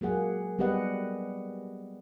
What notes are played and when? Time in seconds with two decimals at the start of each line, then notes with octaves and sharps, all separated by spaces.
0.01 F#3 A#3 G#4 F#5
0.59 G3 B3 G4 B4 D#5 F#5